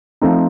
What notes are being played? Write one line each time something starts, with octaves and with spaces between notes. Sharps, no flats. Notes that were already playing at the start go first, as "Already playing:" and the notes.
F3 A3 C4 D#4